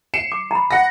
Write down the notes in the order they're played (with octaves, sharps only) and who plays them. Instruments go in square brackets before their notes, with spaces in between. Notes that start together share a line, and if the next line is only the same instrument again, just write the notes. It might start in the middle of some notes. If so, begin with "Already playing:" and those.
[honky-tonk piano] C7 C#7 E7
[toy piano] D6
A#5 B5
[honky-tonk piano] F#5 A#6